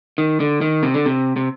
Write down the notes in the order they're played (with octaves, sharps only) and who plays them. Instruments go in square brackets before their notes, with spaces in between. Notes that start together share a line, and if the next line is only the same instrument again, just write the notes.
[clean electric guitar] D#3
D3
D#3
C3
D3
C3
C3